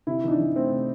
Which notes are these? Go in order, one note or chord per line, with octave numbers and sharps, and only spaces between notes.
C3 E4
E3 D#4
D4
E3
A3 C4
C3